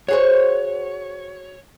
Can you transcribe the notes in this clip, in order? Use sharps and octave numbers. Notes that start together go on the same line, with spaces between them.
F#4 G#4 C5 C#5